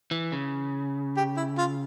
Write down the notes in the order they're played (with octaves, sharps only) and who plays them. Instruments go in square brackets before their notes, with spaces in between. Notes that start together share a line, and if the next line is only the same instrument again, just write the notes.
[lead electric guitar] E3
C#3
[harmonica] G4
E4
F4